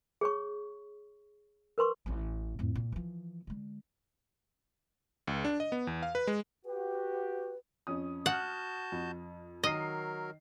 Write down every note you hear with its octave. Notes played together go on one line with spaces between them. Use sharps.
G#4 C#5 C#6
A#4 B4 C6 C#6
A1 C#4
F2 A2
A#2
E3 F3
D3 G#3
C#2
D4
D#5
B3
E2
F5
B4
G#3
F#4 G4 B4
F2 C#4 D#6
F#4 F#5 A5 F6 G6
F2
D#3 F#3 A#4 D#5 C7